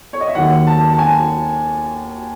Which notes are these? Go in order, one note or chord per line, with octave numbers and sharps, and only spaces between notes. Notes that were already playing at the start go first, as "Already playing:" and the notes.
C#5
D#5
E5
D#2 D#3 F#3 F#5
A5
A5
G#5